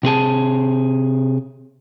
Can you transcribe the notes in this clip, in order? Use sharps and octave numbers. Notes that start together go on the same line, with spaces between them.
C3 C4 G#4 A5